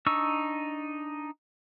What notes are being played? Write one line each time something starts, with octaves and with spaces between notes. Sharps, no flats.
D4 D#4 C#6 E6